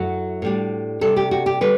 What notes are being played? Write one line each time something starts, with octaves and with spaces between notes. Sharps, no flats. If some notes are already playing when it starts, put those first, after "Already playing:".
Already playing: F#2 F#3 A3 E4 F#4
A2 G3 D4
C3 G3 D4 A4
G4
F#4
G4
D3 G3 B4